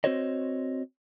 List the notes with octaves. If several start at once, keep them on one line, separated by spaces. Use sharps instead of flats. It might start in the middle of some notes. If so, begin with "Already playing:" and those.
C4 C#4 F#4 C5 C#5 D#5